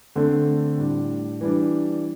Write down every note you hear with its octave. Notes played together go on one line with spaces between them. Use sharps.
D3 A3 C4
A2 G3 D4
E3 G3 D4